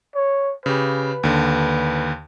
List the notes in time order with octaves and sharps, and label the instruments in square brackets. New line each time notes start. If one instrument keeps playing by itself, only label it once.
[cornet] C#5
[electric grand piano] C#3 G4 [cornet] B4
[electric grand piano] D#2 D3